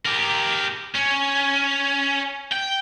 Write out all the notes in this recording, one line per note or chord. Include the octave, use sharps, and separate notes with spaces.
G4 A#4
C#4
G5